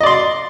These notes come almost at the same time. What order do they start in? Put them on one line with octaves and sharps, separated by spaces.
D#5 D5 C6